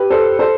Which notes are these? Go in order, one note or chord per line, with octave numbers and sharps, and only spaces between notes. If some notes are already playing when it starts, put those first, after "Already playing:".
Already playing: G4 B4
A4 C5
A4 C5